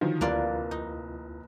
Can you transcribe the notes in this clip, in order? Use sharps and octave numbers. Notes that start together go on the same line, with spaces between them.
D3 D#3 F3 F#3 F4
F1 D2 A#3 D4 E4 F4 D5
D#4